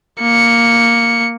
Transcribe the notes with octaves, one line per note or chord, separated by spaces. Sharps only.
A#3 C#7